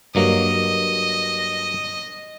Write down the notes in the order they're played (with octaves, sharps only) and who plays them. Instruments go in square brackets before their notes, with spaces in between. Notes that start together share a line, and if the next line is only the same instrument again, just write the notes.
[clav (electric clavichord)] G2 F#3 A#3 [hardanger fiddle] D#5